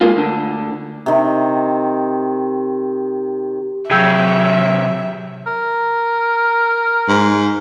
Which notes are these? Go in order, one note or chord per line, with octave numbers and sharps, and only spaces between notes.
G#3 A#3 F4
D2 D3
C3 D#3
C3 F#3 G#4 E5 G5 E6 G6
A#4
G#2